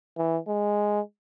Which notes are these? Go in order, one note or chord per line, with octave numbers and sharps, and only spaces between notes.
E3
G#3